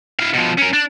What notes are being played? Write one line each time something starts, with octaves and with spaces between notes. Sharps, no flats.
E4 F5
B2 F3
C#4 A#4
D4